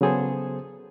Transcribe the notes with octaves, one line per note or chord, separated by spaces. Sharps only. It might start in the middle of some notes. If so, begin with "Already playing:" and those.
C#3 F#3 B3 G#4 A4 C5